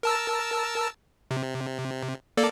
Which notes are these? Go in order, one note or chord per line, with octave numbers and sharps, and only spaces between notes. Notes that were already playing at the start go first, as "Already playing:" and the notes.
A#4 A5 E6
C3
A#3 A4 D5